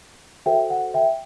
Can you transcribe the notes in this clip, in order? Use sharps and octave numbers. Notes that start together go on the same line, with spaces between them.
F#4 A4 C5 E5 G5
F#5
E5 G5